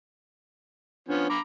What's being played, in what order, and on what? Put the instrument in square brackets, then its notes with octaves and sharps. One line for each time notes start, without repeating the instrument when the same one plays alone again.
[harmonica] F3 B3 C#4 [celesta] D4
[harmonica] A#5 B5 D6